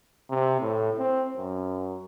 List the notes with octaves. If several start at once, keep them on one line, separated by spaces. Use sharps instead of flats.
C3
A2
C4
F#2